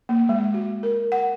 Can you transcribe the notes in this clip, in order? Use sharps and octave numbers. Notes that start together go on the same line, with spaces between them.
A#3
G#3
F#4
A#4
F#5